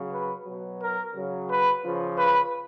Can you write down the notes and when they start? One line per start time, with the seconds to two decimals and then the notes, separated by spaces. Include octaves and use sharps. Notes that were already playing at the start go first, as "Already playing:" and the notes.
Already playing: C#3 F#3
0.12 B4
0.46 B2 F#3
0.81 A#4
1.15 C#3 F#3
1.49 B4
1.84 C#3 F3
2.18 B4